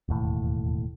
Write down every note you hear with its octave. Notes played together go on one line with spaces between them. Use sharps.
E1 D#2 A2